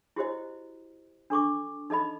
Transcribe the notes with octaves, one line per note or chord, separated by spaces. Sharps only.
E4 F#4 G4 C5 D#5
D4 A4 C#6 D6
D#4 A4 D#5 B5